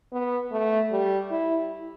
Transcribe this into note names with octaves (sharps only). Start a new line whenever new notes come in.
B3
A3
G3
E4